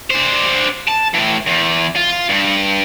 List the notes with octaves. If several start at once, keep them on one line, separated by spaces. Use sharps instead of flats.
D4 C5
A5
A2 E3
E2
F4
G2